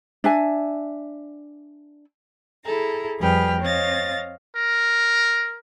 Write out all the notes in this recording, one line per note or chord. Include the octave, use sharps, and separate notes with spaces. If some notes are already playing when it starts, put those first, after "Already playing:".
D4 E5 G#5
E4 G#4 A4 A#5
F2 G3 G#4 B4 G5 F6
C4 C#5 D#5 F5 A6 A#6
A#4